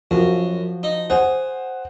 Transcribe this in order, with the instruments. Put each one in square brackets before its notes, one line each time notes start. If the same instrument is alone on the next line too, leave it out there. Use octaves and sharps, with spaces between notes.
[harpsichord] F#2 [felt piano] F3 F#4
[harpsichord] D#4
[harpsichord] G#4 [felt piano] C5 F#5